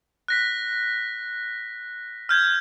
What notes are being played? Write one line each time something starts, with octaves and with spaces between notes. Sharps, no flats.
F#6 A#6 B6
F6 G6 G#6